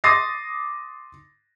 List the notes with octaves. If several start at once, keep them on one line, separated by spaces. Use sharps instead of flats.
C6 D6 D#6 A6 A#6 C7